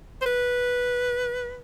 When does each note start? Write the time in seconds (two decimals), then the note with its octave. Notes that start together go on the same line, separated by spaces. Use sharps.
0.22 C5
0.26 B4